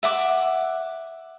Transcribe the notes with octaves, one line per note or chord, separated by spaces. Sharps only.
E5 F#5 D6